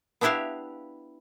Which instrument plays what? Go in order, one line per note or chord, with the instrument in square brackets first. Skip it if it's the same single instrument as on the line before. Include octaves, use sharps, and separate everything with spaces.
[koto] B3 D4 E4 G4 E5 F5